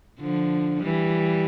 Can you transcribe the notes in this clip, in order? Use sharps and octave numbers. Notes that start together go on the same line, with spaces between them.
D3 F3
E3 G3